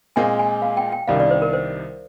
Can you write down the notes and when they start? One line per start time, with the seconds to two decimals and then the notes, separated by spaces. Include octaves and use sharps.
0.16 A#2 G#3 C4 F4 G#5
0.39 G#5
0.62 F5
0.77 G5
0.92 G5
1.07 C2 C3 D#3 G3 D4 F5
1.20 D5
1.31 C5
1.42 A#4
1.53 C5